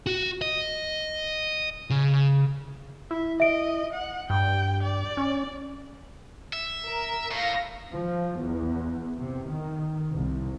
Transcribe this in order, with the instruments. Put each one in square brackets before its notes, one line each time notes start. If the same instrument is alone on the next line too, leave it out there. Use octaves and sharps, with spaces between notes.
[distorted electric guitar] F#4
D#5
C#3
[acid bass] E4 [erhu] E5
[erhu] D#5 [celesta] E5 D7
[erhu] F#5
[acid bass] G2 [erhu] G5
[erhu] D5
[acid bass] C#4
[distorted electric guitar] E5
[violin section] A#4
[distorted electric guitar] A2 [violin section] F5 A#6
[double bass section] F3
E2
C3
D#3
C2